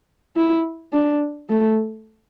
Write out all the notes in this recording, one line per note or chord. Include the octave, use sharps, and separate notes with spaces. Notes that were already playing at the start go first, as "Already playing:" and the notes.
E4
D4
A3